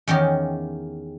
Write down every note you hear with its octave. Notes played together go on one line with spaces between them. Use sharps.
E2 D#3 C#4 G4